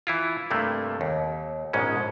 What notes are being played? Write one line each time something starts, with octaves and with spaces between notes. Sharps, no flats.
E3 E4 F4
G2 C3 A3 A#3
D#2
A#1 G#2 B2 G#3 C#4